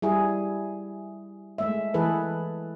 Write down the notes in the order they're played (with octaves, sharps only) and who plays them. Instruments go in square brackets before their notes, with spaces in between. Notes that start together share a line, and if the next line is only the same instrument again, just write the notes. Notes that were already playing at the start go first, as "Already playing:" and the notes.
[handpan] G3 E4 G#4
G#3 A3 E5
E3 A3 G#4 A4 B4